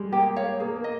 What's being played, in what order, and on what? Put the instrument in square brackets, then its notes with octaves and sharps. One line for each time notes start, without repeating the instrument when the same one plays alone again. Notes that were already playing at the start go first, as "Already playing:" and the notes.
Already playing: [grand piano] G3 G#3
[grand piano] A#3 [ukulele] G4
[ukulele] C#5 F5
[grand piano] A#3 [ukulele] G#4
[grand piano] A#3
[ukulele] D#5